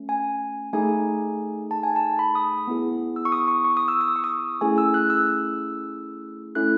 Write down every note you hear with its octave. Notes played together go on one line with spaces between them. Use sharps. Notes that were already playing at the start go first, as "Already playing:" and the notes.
Already playing: A3 C#4
G#5
A3 D#4 G#4 G#5
A5
G#5
A5
B5
D#6
B3 E4 G#4
E6
C#6
D#6
C#6
C#6
D#6
E6
E6
D#6
C#6
D#6
A3 C#4 E4 G#4 G#5
E6
F#6
E6
A3 C#4 E4 A4 F#6